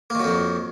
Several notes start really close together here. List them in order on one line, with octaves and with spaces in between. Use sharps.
A#3 D#3 F#3 F2